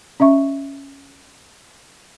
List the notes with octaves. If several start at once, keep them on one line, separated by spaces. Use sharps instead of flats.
C#4 D#5 E5 C#6